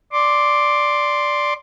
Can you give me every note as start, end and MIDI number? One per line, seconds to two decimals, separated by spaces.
0.12 1.53 74
0.12 1.53 84
0.12 1.53 86